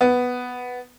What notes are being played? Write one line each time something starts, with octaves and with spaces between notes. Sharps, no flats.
B3